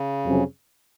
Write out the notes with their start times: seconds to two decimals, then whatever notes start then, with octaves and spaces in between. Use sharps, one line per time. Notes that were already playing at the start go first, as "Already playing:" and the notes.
Already playing: C#3
0.25 F2 C3 F#3 C#4 G#4